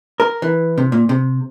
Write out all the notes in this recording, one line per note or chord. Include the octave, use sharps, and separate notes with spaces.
A#4
E3
C3
A#2
C3